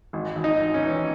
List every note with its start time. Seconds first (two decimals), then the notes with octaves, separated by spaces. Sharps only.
0.13 G#1
0.36 G#1
0.44 D#4
0.59 G#1
0.74 C#4
0.82 E3